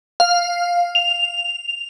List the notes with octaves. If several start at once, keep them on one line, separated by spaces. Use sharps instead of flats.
F5
F7